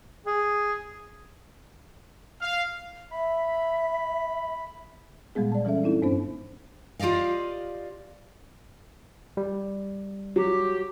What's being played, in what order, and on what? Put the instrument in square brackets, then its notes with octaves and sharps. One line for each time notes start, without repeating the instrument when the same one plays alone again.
[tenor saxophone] G#4
[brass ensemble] F5
[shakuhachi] E5 [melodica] B5
[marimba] A#2 G3 G#3 B3 G#4
D5 A5
E3 G3 C#4 A4 E5
C4 D#4 E4 A4
G2 B3 C#4 D4 C5
[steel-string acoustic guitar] F4 G4 D5 D#5 F5
[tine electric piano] G3
[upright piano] F#3 [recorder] G4